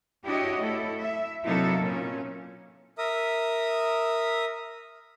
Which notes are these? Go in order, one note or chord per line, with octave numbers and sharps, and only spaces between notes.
D4 E4 F#4 G4 C#5 D#5
A3 E4 A4
E5
C3 F#3 A#3 D#4 E4 A4
A#2 C#4
A#4 E5 D#6